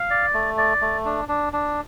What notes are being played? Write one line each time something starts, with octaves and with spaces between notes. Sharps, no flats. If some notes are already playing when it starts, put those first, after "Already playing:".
Already playing: F5
D5
A3
D5
A3
D4
D4
D4